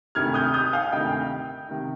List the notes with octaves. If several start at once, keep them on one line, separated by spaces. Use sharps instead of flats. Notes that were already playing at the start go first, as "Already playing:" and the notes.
D2 C3 D#3 F6 G#6
D#6 G6
D#6 G6
F5 G#5
D2 C3 D#3 D#5 G5
C3 D#3